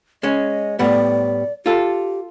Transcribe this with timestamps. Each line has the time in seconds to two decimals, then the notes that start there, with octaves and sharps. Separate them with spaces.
0.23 G#3 C#4 D#5
0.79 A2 G3 B3 D5
1.66 F4 G4 A4